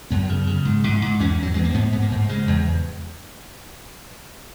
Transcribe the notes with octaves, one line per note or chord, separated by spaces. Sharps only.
F#2 B3
C#3
C#3
G#2
G#2
G#2
E2 C#4
E2 F#3
E2 G#3
A#3
G#2 B3
G#2 B3
A#3
G#2
C#3 G#3
E2